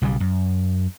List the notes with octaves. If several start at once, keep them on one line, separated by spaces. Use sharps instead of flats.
B1 C#3 F3 G3
F#2